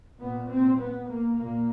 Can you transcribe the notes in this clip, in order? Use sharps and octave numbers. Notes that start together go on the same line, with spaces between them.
A#2 B3
C4
B3
A#3
A#2 A#3